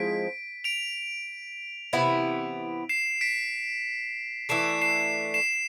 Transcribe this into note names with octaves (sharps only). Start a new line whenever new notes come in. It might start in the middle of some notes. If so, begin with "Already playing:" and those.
Already playing: F3 G#3 C4 E4 B6 D7
D7 F7
C3 E3 B3 E4
C7 E7
B6 D7
E3 A3 D4 C7 E7
C7 E7
C7 E7